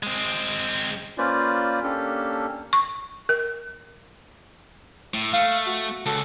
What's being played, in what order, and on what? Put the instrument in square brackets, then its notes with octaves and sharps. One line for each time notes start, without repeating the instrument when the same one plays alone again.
[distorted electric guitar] G#3 C4
[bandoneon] A#3 C#4 F4 B4 C5 D5
A#3 C#4 D4 G4 A4
[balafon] C#6
A#4
[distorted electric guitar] A2
[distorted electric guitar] A3 [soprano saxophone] F5
[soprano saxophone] F#4
[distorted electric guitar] C#2 [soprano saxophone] A4